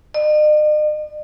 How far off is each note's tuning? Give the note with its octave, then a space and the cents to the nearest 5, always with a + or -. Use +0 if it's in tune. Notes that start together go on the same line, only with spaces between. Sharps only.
D#5 -45